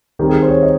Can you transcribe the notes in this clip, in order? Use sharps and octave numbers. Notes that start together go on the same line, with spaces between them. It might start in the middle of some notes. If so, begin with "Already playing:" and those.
D#3 G3 C4 D#4 G4
G#4
C5
C#5
D#5